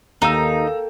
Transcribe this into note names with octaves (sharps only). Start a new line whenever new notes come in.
D#2 A#3 D#4 A4 G5 A#5 E6